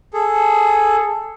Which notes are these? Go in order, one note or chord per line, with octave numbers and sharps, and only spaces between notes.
G#4 A4